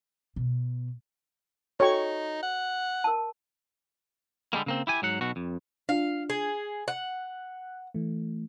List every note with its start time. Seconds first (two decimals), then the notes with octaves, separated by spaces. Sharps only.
0.36 B2
1.80 D#4 F#4 A4 C#5 G5 C#6
2.43 F#5
3.04 A#4 A5
4.53 D3 G3 G#3 A#3
4.66 C#3 A#3 C4
4.87 E4 G4 G#5
5.02 G#2 F#3 F#5
5.21 B1 B2 F#4
5.36 F2
5.89 D4 F4 F5
6.30 G#4
6.88 F#5 F#6
7.94 E3 A3